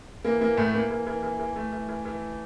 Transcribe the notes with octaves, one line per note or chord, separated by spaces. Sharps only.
E3 A#3
E3 A#3
A2 A3
E3 A#3
E3
E3
E3
E3
E3 A3
E3
E3
E3